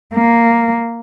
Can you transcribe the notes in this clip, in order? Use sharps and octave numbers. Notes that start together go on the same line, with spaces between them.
A#3